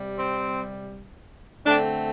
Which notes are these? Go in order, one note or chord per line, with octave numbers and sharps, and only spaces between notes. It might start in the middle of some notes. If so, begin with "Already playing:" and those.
Already playing: C3 G3
C4
D3 A3 C4 D4